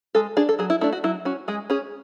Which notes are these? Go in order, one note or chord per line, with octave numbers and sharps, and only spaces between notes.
G#3 A4
D4 G#4
A4
F#3 G#4
E4
A3 D4 E4
F#4
F#3 E4
C#4 F#4
G#3 G#4
C#4 G#4